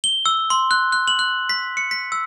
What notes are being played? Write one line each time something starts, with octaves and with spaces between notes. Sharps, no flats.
G7
E6
C6
F#6
F#6
F#7
F#6
B6
C#7
B6
E6